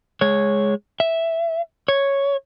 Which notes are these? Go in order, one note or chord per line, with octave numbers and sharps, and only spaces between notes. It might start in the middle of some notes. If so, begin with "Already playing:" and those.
G#3 C#5
E5
C#5